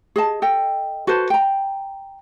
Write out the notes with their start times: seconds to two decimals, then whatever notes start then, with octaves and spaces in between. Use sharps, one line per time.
0.16 G#4 D#5 A5
0.42 A4 D#5 G5
1.07 F#4 A4 B4 C5
1.30 G5 A#5